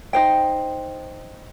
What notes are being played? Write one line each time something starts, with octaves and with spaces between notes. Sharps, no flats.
D#4 C5 G5